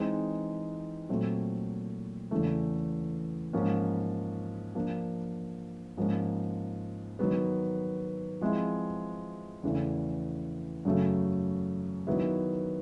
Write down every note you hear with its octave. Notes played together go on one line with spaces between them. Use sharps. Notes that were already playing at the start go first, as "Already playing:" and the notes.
Already playing: E3 G#3 C4 D#4
A#2 F#3 A3 C4
E2 C#3 E3 A3
G#2 F3 A#3 C#4
F3 A#3 D4
G#2 F3 A#3 C#4
D#3 F#3 B3
F3 G#3 C4 E4
E2 C#3 E3 A3
F#2 C#3 F#3 A3
D#3 F#3 B3 E4